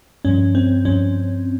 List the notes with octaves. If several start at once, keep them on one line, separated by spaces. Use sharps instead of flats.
G2 F3 C#4
C4
G2 F3 C#4